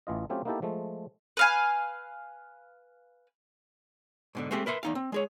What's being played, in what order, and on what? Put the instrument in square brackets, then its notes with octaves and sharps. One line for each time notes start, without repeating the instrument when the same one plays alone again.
[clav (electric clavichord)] A1 E3 F4 D#5
F#3 A3 C4 C#4 F4 G4
A#3 B3 D#4 E4 G4 A4
F3 G#3 A3
[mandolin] B4 F5 G#5
[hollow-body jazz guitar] G#2 B2 D3
G#3 A3 C4 G4
A#4 B4 E5 C6
E2 D#4 F5
C4
G#3 G#4 C#5